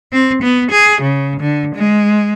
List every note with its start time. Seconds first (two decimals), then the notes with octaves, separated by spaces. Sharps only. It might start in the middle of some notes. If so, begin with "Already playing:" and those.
0.12 C4
0.42 B3
0.70 G#4
1.01 C#3
1.40 D3
1.75 G#3